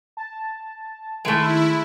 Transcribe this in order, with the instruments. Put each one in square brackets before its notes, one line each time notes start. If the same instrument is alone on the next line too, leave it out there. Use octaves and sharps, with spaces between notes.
[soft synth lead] A5
[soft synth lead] D#3 [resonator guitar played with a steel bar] G#3 A3 [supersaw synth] E4